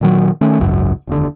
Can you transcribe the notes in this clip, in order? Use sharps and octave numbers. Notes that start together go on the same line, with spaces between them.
A#2 D#3 F#3
D#3 A3 C#4
G#1 C#2 F#2
F1 D#2 D3